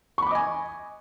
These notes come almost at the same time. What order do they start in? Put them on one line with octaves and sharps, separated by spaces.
C#6 B5 D6 D#5 G#5